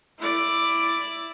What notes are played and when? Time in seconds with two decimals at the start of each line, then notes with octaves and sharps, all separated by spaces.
0.20 E4 D5